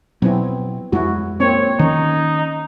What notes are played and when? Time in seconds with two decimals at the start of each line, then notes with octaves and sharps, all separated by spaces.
0.22 B2 F#3 B3 C4 E4
0.92 F2 G#3 E4 F#4
1.40 A#3 C4 C#5
1.79 D#3 C#4 D#4